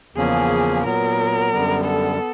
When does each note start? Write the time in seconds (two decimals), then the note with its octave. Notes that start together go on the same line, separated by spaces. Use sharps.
0.16 E2 C#3 F3 A#3 C#4 G#4
0.84 A#2 F#3 B3 A#4
1.51 F#2 D3 G3 B3
1.84 A4
2.18 B3